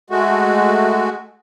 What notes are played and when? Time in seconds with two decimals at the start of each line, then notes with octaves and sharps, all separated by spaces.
0.10 G#3 A3 F#4